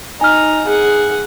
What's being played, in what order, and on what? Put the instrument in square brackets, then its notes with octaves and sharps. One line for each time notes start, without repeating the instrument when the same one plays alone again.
[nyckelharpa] D#4 A#5 [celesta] G#5 F6
[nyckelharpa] G#4 F#5